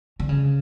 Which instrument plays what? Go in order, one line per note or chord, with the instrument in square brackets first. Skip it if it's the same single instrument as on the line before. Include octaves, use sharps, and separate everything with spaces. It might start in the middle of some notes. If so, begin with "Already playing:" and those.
[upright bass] D3
C#3